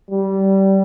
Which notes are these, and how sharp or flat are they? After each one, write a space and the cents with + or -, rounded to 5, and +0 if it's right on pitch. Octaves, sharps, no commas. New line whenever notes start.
G3 -20